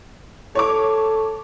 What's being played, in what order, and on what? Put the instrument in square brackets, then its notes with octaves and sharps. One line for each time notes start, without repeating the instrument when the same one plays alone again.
[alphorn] A4 [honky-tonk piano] C#5 C#6 D6